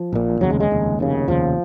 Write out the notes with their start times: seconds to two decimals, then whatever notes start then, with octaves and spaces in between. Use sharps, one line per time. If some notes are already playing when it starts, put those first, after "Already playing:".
Already playing: F3
0.13 A#1 A#2
0.41 F1 D#2 C#3 F#3
0.50 G#3
0.60 G#3
0.70 F1 D#2 C#3
0.99 F1 D#2 C#3
1.28 F1 D#2 C#3 F3